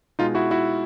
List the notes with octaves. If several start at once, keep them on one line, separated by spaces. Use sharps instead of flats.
B2 G#3 D#4 F4
E4 F#4
E4 F#4